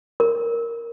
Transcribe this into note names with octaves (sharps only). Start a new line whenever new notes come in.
A#4